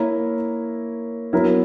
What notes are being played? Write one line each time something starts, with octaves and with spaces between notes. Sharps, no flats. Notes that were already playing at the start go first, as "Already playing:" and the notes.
Already playing: A#3 E4 A#4 C#5
F#3 B3 E4 A#4 C#5